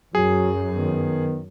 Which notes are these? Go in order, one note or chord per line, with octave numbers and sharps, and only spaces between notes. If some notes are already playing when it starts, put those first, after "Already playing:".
F#2 F#3 G#4
D#3 B3